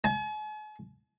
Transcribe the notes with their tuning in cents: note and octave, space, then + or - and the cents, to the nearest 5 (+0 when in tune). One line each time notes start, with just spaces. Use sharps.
G#5 +45